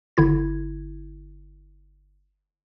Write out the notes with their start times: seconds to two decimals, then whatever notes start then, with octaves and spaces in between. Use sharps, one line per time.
0.17 G1 D3 E4 G#6